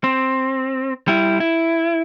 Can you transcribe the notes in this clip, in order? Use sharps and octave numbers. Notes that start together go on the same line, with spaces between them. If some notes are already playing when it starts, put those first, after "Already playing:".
C4
G3 E4
E4